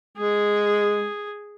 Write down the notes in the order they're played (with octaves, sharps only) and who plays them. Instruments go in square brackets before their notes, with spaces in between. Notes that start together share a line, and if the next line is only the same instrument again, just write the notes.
[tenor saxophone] G#3 [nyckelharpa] G#4